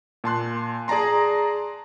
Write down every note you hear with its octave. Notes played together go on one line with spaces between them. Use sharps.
A#2 A5 C6 F#6
G#4 D5 A5 A#5 C6